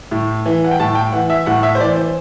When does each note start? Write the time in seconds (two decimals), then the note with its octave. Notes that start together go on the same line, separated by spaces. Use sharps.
0.11 A2
0.46 E3
0.64 F#5
0.71 G5
0.80 A2 A5
0.95 G5
1.12 E3 F#5
1.30 E5
1.46 A2 F#5
1.63 E5
1.75 C5
1.80 E3 D5
1.96 C5